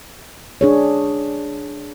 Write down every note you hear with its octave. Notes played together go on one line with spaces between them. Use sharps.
D4 G#4 C#5